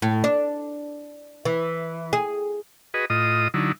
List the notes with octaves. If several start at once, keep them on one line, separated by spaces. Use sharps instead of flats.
A2
D4
E3
G#4
F#4 G#4 B4 D#5
A2 F4 D#5 D#6
D3 F#3 D#4 E4